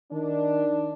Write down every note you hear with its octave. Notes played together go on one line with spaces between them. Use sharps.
D#3 D4